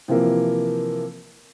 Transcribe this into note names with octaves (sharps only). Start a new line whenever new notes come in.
C3 E3 F3 A#3